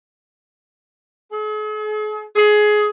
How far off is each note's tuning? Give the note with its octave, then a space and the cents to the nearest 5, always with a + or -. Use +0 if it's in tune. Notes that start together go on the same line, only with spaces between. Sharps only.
G#4 +45
G#4 +20